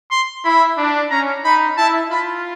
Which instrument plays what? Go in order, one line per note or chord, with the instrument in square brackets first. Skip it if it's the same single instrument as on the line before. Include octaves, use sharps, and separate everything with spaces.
[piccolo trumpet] C6
[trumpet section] E4 [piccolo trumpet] B5
[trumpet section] D4
[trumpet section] C#4 [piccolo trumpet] A#5
[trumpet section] D#4 [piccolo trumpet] B5
[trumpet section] E4 [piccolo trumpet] A5
[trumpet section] F4 [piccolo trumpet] B5